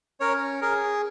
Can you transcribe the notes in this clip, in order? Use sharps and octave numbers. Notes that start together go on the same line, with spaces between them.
C#4 A#4 C#5
G#4 A#4